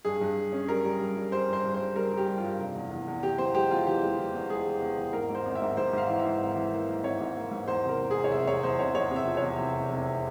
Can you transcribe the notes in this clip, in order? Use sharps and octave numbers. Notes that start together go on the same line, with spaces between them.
G2 G#4
G2
G2
C#4
G3 A#4
G3
G2
G3
G3 C5
G2 C5
G2
C5
G3
G3 A#4
G3
G4
G3
F4
G2
F1
E2
E2
E2
E2 G4
E2 C5
G#3 G4
E2 F4
E3 G4
G#3
E3
E2
G#3 G#4
E3
E2
E2
G#2 A#4
G#2
C5
G#1
E5
G#2
G#2 C5
G#2 F5
E3
E5
G#2
G#1
E3
A#3
A#3
G#1 C#5
G#2
A#3
G#2
E2 C5
C3 A#4
C3
E2 G#4
C#5
F1 E5
E2 C#5
E2 C5
F1 C#5
E2 C#5
C3
E5
F3
C#5
E2
C3
F1
F1